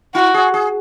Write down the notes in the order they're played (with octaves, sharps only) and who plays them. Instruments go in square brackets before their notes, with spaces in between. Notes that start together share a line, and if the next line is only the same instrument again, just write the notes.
[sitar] E4 [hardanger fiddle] F#4
[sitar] G#4
G#4